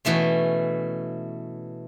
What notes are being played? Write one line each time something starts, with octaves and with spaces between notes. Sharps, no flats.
B2 E3 A3 C#4